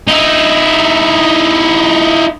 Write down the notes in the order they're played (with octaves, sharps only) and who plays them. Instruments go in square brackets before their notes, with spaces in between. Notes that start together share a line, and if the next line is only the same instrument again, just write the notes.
[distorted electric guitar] D#4 E4